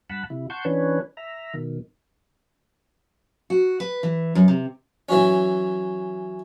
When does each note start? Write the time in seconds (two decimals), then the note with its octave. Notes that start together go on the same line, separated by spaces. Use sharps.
0.10 G2 F#5 A5 B5
0.30 C3 E4
0.50 F#5 A5 C6 C#6 G6
0.65 E3 C#4 D4 B4 C#5
1.17 E5 A#5
1.54 B2 D#3
3.50 F#4
3.80 B4
4.03 E3
4.35 F#2
4.48 C3
5.09 E3 F#3 C#4